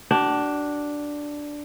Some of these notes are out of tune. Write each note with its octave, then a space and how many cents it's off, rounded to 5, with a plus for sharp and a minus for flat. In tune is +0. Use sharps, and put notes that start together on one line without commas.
D4 +0 F#4 +45